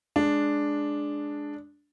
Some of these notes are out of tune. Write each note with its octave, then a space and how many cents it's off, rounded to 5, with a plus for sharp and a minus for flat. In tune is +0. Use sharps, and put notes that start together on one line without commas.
G#3 +5 D4 +0